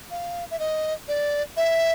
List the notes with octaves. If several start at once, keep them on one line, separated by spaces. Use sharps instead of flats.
F5
E5
D#5
D5
E5